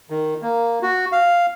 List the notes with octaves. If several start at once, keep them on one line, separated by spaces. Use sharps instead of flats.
D#3
A#3
F#4
F5